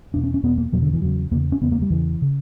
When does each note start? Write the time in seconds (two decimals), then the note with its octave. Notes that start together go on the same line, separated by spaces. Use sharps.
0.14 E2 B2 D4
0.24 C#4
0.34 C#4
0.43 E2 B2 B3
0.58 A#3
0.72 E2 B2 F#3
0.82 D3
0.93 E3
1.02 E2 C#3 F#3
1.31 E2 A#3
1.34 C#3
1.52 C#4
1.61 E2 C#3 B3
1.72 A#3
1.82 G3
1.90 E2 C#3 E3
2.22 C#3